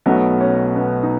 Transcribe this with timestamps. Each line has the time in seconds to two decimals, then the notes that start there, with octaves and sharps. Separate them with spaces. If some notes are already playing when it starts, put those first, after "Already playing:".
0.06 B1 B2 F#3 A3 B3
0.41 C#4
0.76 B3
1.03 D#4